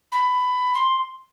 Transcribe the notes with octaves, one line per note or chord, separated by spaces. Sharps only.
B5
C6